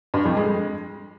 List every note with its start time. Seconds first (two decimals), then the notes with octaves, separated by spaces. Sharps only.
0.14 G2
0.25 F2
0.37 G#3